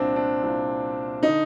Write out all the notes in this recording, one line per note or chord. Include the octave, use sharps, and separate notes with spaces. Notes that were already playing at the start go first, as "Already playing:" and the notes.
Already playing: C2 A#2 C4 D4
D4
C2 A#2
D3 D#4